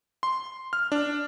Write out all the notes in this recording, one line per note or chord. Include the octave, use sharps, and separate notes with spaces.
C6
F6
D4